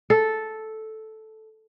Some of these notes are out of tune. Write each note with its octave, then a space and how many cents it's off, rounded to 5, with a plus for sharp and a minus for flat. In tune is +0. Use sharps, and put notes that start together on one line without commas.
A4 -5